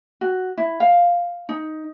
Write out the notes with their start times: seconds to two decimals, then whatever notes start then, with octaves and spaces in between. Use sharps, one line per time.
0.21 F#4
0.58 E4
0.80 F5
1.49 D#4